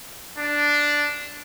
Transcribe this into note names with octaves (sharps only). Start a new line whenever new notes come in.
D4